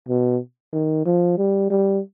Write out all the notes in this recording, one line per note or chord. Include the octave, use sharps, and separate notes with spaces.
B2
D#3
F3
G3
G3